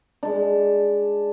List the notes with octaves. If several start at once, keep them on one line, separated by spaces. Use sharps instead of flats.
G#3 D4